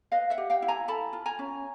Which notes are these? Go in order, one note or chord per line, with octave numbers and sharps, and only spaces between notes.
B4 D#5 F5
E5 F#5
G4
F5 G5
E4
G#5 A#5
A4 A5 B5
F4
G#5 A#5
C#4